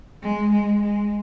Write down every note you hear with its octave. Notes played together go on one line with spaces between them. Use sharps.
G#3
G#3
G#3